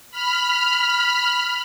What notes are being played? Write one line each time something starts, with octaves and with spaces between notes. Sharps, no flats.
B5 F6